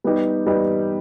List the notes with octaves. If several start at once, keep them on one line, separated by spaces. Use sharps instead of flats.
G3 B3 D#4 G4
G3 B3 D#4 G4